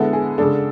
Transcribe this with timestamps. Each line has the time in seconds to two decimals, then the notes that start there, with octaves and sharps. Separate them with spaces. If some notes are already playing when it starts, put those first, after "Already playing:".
Already playing: D3 G#3 B3 E4 A4
0.13 G#4
0.38 C#3 G#3 D4 A4